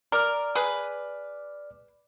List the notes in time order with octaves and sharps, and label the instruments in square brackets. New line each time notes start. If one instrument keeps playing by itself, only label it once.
[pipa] A#4 [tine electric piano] D5 D6 F6
[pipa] G#4 B4